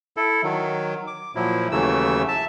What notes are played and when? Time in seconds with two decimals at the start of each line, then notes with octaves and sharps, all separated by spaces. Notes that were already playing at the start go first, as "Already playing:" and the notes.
0.17 E4 A4
0.44 D#3 F#3
1.07 D6
1.35 A#2 F3 F#3 E4
1.72 D#2 C#3 E3 F#3 A3 E6
2.28 E5 A5